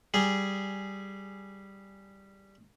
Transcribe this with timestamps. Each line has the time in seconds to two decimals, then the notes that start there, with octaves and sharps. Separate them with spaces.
0.14 G3 G#4